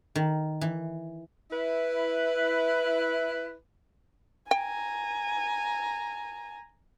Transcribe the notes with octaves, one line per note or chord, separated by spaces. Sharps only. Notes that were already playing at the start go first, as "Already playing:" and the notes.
D#3
E3
E4 B4
G5 G#5 A#5